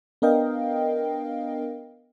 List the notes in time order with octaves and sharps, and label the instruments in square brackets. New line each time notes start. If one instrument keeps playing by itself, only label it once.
[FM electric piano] B3 D4 A#4 D#5 F5 G5